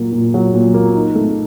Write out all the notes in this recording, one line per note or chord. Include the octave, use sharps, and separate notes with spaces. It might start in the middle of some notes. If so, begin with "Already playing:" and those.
Already playing: A#2 F#3 A#3
A#2
F#3
A#2
A#3
D#4
A3